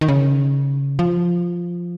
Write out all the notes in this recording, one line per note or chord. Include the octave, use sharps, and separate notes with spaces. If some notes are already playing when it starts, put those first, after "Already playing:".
D#3
C#3
F3